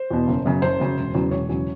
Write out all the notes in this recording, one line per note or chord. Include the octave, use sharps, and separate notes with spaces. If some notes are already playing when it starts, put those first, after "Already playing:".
Already playing: C5
E2 B2
F#1
F#2 C#3 F#3
F#1 C5
F#2 C#3 F#3
E1
E2 C#3 F#3
E1 C#5
E2 C#3 F#3